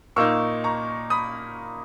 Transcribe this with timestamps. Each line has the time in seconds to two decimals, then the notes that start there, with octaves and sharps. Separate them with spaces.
0.16 A#2 A#3 D#4 C#6 E6
0.64 A#5 C#6
1.10 B5 D#6